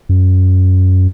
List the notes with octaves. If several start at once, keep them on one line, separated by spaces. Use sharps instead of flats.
F#2